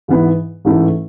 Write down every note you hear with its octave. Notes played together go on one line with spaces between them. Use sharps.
G#2 E3 B3 E4
A1 G#2 E3 A3 E4